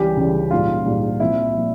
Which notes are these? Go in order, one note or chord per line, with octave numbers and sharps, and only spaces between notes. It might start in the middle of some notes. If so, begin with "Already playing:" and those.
Already playing: C#2 C#3 E3 G3 G4
C#2 C#3 E3 G3
A#1 G#2 G3 F4
A#1 G#2 G3
C2 A#2 F3 E4
A#2 F3